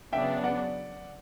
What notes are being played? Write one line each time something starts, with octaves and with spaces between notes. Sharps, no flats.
C#3 F#3 B3 D4 E5 G5
D5 F#5